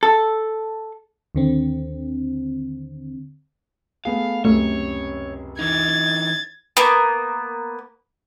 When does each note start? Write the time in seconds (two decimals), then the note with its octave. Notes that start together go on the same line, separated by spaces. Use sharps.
0.03 A4
1.35 D#2 D3 C4
4.05 A3 B3 G#4 F5
4.45 C#2 F#2 C3 A3 C#5
5.59 E3 D#4 G#6 A6
6.77 A#3 B3